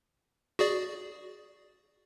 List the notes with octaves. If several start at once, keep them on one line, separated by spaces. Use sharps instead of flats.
F#4 G#4 D5